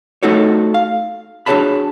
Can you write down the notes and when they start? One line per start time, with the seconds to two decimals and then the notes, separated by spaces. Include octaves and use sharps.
0.23 A3 D#4 F#4 A4 C#5
0.74 F5
1.46 D4 F#4 G#4 C#5 A5 B5